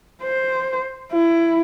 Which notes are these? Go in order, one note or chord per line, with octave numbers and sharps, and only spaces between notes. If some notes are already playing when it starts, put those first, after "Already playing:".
C5
E4